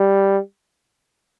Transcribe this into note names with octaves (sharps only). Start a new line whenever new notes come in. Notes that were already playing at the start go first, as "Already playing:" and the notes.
Already playing: G3